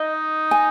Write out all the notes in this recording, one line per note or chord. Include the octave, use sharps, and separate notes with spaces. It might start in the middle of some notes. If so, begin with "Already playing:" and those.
Already playing: D#4 D#5
G#5